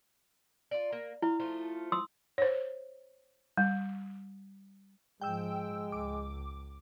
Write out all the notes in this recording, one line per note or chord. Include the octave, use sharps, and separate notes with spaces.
F4 D5
A#3
E4 F4
F3 A3 F4
C6 D#6 E6
C5 C#5
G3
G#2 F3 G#3 G5 E6
C#2 D6